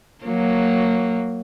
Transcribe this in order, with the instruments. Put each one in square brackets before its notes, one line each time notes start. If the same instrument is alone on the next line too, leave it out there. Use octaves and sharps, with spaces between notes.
[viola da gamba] F#3 A#3